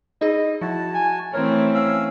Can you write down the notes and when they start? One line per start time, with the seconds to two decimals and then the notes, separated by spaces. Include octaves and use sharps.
0.21 D#4 G#4 D#5
0.61 F3 E4 F#4 A5
0.94 G#5
1.34 E3 A3 C4 A#4 C#5
1.75 C#4 F5 E6